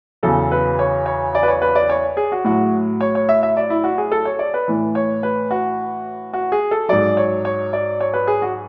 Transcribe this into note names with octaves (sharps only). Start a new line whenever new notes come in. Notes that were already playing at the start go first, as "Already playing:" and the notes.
E2 C#3 F#3 A4
B4
C#5
C#5
D5
B4
C#5
B4
D5
C#5
G#4
F#4
A2 F#3 F#4
C#5
C#5
E5
E5
D5
E4
F#4
G#4
A4
C#5
D5
B4
A2 E3
C#5
B4
F#4
F#4
G#4
A4
G#2 F#3 D5
C#5
C#5
D5
C#5
B4
G#4
F#4